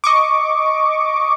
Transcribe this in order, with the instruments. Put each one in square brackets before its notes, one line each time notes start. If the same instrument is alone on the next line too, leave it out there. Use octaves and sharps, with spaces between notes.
[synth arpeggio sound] D#5 C#6 D6